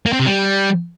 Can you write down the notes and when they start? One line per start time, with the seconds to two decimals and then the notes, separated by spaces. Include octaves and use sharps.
0.06 A#3
0.13 C4
0.19 C3
0.26 G3